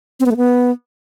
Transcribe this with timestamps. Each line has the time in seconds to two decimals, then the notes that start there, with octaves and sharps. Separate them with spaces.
0.20 C4
0.26 B3
0.31 A3
0.37 B3